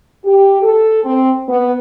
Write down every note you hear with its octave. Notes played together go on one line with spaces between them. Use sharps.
G4
A4
C4
B3